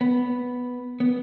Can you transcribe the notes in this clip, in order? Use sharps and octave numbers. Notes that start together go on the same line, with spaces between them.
B3
B3